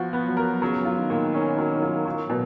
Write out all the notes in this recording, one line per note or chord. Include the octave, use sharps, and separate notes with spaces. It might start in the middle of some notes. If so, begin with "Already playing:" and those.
Already playing: F3 B3 F#4
B3
F#3
A#4
C#3 F#3
F4
D#3
A#2
C#4
F#3
F4
F#3
B2